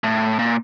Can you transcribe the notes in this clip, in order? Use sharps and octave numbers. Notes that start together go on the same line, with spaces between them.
A2
A#2